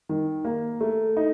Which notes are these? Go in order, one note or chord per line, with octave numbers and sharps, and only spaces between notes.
D#3
A#3
A3
D#4